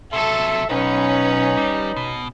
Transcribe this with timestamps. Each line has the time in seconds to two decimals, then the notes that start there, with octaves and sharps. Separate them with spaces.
0.13 C3 F#3 A4 E5
0.70 B1 C#4 D#4 B4
1.57 G3
1.96 B2